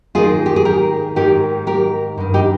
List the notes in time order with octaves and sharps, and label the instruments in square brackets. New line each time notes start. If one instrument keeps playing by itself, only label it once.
[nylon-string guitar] G#2 D#3 F4 G#4
G4
G#4
G4 A#4
G#2 D#3 G4 A#4
G4 A#4
G2 D#3
D#4 G4